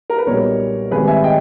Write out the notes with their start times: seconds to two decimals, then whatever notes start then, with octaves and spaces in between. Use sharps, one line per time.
0.10 A#4
0.18 B4
0.26 B1 A#2 G3 B3 A#4 C#5
0.91 G#1 G#2 G3 G#4 B4
1.07 E5 G#5
1.24 D#5 G5